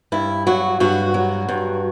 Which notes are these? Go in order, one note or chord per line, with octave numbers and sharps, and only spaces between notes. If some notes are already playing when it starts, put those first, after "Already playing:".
G2 E4
F#3 F#4
G2 F#4
F#3
G2